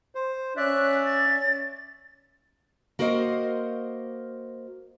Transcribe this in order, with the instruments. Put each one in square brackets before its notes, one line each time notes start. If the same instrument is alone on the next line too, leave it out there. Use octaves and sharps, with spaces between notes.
[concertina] C5
[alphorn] C#4 [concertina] D5 E5 [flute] F#6
[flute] A6
[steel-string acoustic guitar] A#3 F#4 A#4 C5 D#5